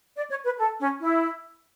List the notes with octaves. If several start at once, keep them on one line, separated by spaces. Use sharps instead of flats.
D5
C#5
B4
A4
C#4
E4